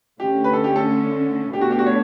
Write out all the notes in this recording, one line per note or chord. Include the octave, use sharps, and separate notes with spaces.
D3 A3 C#4 G4
B4
A4
G4
A4
B2 A3 D4 G4
F#4
G4
F#4
C#5